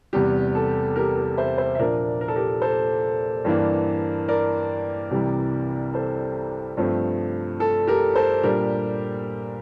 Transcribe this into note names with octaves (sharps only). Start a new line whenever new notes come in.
E2 C3 G3 G4
A4
G4 A#4
G4 A#4
C5 E5
C5 E5
E5
A#2 F3 A#3 D4 A#4 D5
A#4
A4
G4 A#4
A4 C5
G2 E3 A#3 D4
A#4 D5
C2 C3 E3 G3
A4 C5
G2 F3 A3 C4
A4
G4 A#4
A4 C5
A#2 G3 D4 G4 A#4